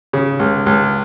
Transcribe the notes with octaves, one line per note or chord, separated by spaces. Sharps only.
C#3
C#2
C#2